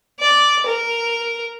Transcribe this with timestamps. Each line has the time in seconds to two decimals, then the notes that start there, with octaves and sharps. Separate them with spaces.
0.20 D5
0.66 A#4